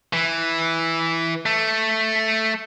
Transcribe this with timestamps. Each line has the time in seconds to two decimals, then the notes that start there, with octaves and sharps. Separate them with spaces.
0.13 E3
1.46 A3